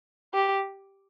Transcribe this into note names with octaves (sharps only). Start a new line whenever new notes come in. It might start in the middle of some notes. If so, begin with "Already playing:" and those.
G4